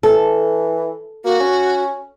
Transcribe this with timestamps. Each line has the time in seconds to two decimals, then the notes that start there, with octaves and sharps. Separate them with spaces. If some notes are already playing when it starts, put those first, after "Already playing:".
0.03 E3 A4
1.24 A#3 F#4
1.40 C#4